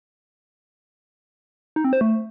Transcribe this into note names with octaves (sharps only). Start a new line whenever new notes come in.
D#4
C4
C5
A3